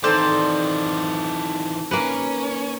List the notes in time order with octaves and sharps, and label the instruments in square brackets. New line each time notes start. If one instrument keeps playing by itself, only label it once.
[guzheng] D#3 C4 D#4 [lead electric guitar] E3 F4 [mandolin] A4 C5 D5
[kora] A#3 B4 [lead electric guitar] C#4